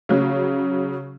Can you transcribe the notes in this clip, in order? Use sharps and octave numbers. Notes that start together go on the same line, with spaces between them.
C#3 F#3